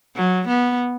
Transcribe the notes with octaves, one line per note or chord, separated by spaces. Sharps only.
F#3
B3